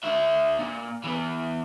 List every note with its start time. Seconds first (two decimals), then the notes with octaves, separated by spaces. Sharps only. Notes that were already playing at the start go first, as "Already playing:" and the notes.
0.04 D4 E5
0.59 A#2
1.04 E3 B3